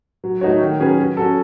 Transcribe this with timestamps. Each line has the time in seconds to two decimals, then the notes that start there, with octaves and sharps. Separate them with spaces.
0.24 F#3
0.41 A3 D#4 F#4 C#5
0.61 D#3
0.80 F#3 C#4 G#4 B4
0.98 F#3
1.17 C#4 F#4 A4